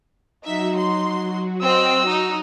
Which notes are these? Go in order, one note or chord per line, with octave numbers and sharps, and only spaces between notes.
F#3 D#4 F#4 E5
C6
C4 D#5 E6
D#4